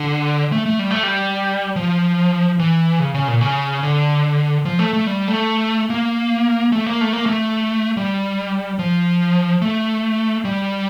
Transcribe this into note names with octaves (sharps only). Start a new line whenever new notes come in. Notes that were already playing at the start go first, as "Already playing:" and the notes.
Already playing: D3
A3
A3
G3
A3
G3
F3
E3
C#3
C#3
A#2
C#3
D3
F3
A3
A3
G3
A3
A#3
A3
A#3
A3
A#3
A3
G3
F3
A3
G3